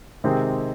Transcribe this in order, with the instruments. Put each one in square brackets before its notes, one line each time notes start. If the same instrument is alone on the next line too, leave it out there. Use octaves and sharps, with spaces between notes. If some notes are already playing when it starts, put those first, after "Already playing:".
[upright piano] C3 D#3 G#3 C4